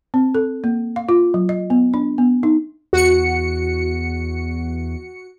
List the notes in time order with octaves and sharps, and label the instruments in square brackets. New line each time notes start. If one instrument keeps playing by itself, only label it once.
[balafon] C4
A4
A#3
F5
F4
F#3
D#5
B3
D4
B3
D#4
[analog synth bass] E2 [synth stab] F#4 C#7